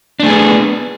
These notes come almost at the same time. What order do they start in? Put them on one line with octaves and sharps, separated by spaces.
D4 A3 G#4 B3